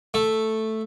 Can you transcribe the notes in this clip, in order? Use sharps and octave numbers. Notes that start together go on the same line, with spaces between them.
A3